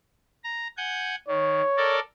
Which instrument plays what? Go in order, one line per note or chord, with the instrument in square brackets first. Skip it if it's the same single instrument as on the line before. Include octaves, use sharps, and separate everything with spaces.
[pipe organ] A#5
F#5 G#5 G6
[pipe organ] D#3 [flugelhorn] C#5
[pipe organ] A4 A#4 D5